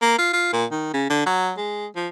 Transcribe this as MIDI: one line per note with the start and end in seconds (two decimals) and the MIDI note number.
0.02 0.17 58
0.18 0.32 65
0.33 0.51 65
0.53 0.65 46
0.71 0.89 51
0.94 1.09 49
1.10 1.24 50
1.26 1.51 54
1.57 1.87 56
1.96 2.08 53